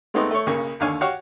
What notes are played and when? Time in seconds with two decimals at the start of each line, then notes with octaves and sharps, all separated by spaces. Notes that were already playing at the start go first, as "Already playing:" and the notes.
0.14 G#3 A3 B3 C4 D#4
0.31 A3 C#5
0.46 B1 C#3 A#3 C#6
0.80 D#2 D3 C#5 F5 G#5
1.01 F#4 G4 C#5 F5